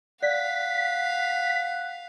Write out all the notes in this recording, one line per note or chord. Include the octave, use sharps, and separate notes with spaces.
D5 F5 F#5 B6